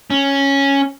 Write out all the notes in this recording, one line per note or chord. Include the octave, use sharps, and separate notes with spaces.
C#4